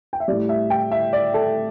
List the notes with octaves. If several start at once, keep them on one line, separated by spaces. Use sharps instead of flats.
G5
E5
A2 G3 D5
E5
G5
E5
D5
A4